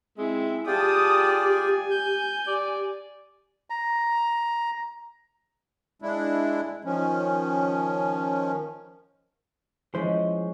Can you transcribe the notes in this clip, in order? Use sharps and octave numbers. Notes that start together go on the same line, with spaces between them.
G#3 C4 E4 E5
F4 G4 G#4 D5 G5 A5 D#6
G#5
G6
G4 D5
A#5
G#3 D4 E4
D#3 F3 C#4
F3 G#3 C#4 E4 C5